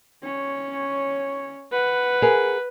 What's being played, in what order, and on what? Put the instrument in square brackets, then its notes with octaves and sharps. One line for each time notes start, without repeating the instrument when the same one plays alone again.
[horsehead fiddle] C#4 C#5
[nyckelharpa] B4 [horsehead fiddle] F#5
[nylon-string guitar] G#4 A#4